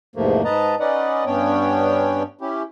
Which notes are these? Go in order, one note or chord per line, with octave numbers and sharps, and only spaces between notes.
E2 G#2 C3 F3 A3 A#3
G#2 B4 D#5 A5 A#5
C#4 D#4 B4 D5 D#5 F#5
G2 B3 C#4 D4 C#5 G5
C#4 E4 G4